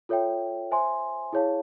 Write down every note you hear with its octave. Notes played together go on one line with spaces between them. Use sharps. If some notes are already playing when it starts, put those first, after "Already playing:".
F4 A4 C#5 E5 G5
C5 E5 G#5 C6
E4 G#4 C#5 F5 A5